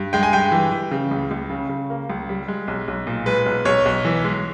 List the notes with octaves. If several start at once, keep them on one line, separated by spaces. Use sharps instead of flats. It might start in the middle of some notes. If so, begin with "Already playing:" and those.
Already playing: G2
G#3 G5
G#5
G2 G5
E3
E3
C#3
C#2
C#2
C#3
C#3
A#3
C#2
G3
G#3
B1
B1
A#2
G#3 B4
B1
B1 C#5
B1
E3
G#3